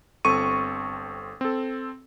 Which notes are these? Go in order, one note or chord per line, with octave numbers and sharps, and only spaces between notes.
G1 C4 A4 C#6 D#7
C4 A4